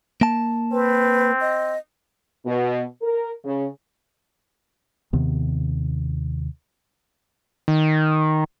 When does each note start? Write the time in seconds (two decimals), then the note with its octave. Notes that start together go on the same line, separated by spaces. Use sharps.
0.21 A#3 A5
0.72 C4 B4
1.41 D#5
2.46 B2
3.02 A#4
3.44 C#3
5.13 D#2 C3 D#3 B3
7.68 D#3